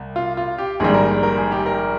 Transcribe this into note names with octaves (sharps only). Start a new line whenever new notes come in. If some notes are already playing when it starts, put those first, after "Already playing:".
Already playing: C2
F4
F4
G4
A#1 G#2 D#3 G3 G#4
A#4
A#4
G#4
G4
A#4